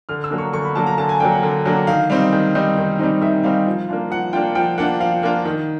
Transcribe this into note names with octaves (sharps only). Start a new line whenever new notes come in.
D3 F6
E6
F#3 A#3 D4
C#6
D3 C#6
B5
F#3 A#3 D4 A5
A#5
D3 A5
G#5
F#3 A#3 D4 G5
F#5
D3
F#3 A#3 D4
D#3 F5
G3 C4 D#4 F5
D#3
G3 C4 D#4
D#3
G3 C4 D#4
D#3 E5
G3 C4 D#4 F5
F3
A#3 D4 F4
F3 F#5
A#3 D4 F4 G5
F3 G5
A#3 D4 F4 F#5
F3 F5
A#3 D4 F4
D#3